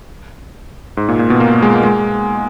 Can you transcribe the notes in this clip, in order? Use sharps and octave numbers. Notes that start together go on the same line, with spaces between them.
G#2
A#2
A#2
B2
A#3
G#3
G#3